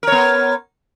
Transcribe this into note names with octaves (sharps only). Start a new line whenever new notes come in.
B3 A#4 C#5